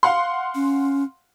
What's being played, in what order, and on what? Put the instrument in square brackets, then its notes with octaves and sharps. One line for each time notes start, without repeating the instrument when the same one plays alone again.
[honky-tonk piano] F5 F#5 C6
[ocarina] C#4